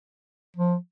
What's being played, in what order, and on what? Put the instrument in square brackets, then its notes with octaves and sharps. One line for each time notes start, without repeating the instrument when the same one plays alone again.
[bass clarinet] F3